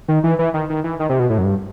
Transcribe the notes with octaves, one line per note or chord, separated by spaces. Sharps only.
D#3
E3
E3
D#3
D#3
E3
D#3
C3
B2
A2
F#2
G2